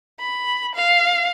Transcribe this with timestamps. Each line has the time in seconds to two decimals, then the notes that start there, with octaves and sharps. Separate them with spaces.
0.20 B5
0.75 F5